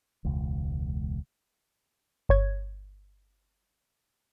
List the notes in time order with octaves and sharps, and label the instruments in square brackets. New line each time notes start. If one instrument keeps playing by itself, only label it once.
[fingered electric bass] E1 C#2
[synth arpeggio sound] G1 C#5 G#6